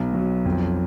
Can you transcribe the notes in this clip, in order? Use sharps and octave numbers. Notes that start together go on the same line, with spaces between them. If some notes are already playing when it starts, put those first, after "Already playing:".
Already playing: B1
F#3
F2